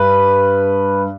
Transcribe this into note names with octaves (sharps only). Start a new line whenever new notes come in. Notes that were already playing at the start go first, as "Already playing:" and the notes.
Already playing: G2 B4